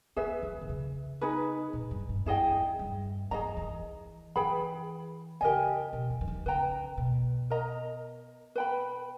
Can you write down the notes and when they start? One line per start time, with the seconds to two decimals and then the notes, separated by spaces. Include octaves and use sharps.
0.16 B3 G#4 B4 E5
0.42 D#3
0.61 D#3
0.69 C#3
1.21 D#4 G#4 B4
1.73 A#2
1.91 G2
2.09 G2
2.26 G2 E4 G#4 D#5 G5
2.52 E2
2.79 G2
3.31 E3 G#4 D#5 A#5
3.57 E3
4.36 E3 G#4 B4 G5 B5
5.41 C#3 G4 A#4 D#5 G#5
5.93 B2
6.10 E3
6.21 E3
6.28 D#3
6.46 C#3 B4 G5 A#5
6.97 B2
7.50 A#4 D#5 A#5
8.55 B4 G5 B5